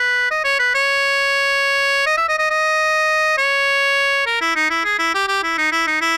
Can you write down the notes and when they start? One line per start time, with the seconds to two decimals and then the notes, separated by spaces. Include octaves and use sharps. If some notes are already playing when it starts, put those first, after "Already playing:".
Already playing: B4
0.31 D#5
0.44 C#5
0.59 B4
0.75 C#5
2.06 D#5
2.17 E5
2.28 D#5
2.38 D#5
2.50 D#5
3.38 C#5
4.26 A#4
4.41 E4
4.56 D#4
4.70 E4
4.84 G#4
4.99 E4
5.14 G4
5.28 G4
5.43 E4
5.58 D#4
5.72 E4
5.87 D#4
6.01 E4